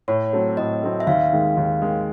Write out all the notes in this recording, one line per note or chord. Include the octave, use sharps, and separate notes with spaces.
A2 C#5
F#3 A3 C4
A2 D#5
F#3 A3 C4
E5
D#2 F5
D#3 G#3
D#2
D#3 G#3